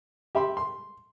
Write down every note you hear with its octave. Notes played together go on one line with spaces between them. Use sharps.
G4 E5 B5 C6
C6